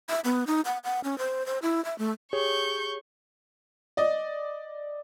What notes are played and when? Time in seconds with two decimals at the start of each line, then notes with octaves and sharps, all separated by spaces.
0.09 E5
0.24 B3
0.47 D#4
0.65 F#5
0.84 F#5
1.04 C#4
1.18 C5
1.46 C5
1.62 E4
1.85 E5
1.99 A3
2.33 G4 G#4 C#5 C#6 G6
3.97 D5 D#5